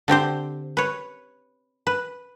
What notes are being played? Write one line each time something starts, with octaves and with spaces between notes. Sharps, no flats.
D3 C4 G4 C5
B4 C#5
B4